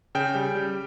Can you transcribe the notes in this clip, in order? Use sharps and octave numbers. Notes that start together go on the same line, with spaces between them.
C#3 G5
G3
G3